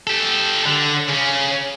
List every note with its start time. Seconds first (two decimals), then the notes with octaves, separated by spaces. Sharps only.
0.07 G4 A4
0.66 D3
1.08 C#3 C#4